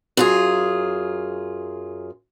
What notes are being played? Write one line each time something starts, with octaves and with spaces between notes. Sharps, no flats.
F#2 F4 G#4